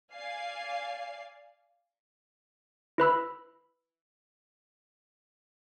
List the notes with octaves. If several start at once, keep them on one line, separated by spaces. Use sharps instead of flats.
D5 F5 G#5 C7
E4 B4 B5 E6